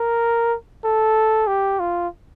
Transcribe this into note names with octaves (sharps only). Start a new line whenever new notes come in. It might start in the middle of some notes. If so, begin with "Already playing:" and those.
Already playing: A#4
A4
G4
F4